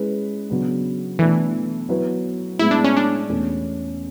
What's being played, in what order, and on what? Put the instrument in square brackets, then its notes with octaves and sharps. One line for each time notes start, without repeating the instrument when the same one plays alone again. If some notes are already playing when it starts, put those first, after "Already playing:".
Already playing: [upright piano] G#3 C#4 E4 B4
C#3 F#3 B3 D4
[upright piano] B2 A3 D4 A4 [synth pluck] E3
[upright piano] F#3 B3 E4 B4
[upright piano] A2 G#3 B3 [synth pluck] E4
[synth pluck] D4
C#4
D4
[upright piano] E2 B2 A3 C#4